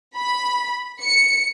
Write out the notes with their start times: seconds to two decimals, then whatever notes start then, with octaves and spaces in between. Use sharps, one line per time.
0.17 B5
1.01 C#7